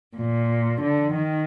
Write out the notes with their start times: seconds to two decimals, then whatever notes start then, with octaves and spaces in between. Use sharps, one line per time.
0.16 A#2
0.81 D3
1.14 D#3